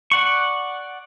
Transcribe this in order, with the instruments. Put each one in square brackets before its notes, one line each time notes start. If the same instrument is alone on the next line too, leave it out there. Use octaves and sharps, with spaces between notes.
[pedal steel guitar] D5 F#5 C#6